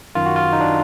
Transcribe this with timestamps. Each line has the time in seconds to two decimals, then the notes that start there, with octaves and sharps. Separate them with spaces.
0.15 F#2 D#3 F4
0.26 F#4
0.36 F4
0.53 D#4
0.61 D4